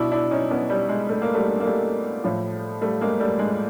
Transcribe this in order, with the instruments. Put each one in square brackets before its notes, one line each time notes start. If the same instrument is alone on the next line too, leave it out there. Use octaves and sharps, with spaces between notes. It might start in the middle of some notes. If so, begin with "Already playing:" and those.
Already playing: [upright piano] B2 D4 E4
D4 E4
C#4 D#4
B3 C#4
G3
G#3
A3
A#3
G3 A3
A#3
G3 A3
A2 F3
G3 A3
G#3 A#3
G3 A3
G#3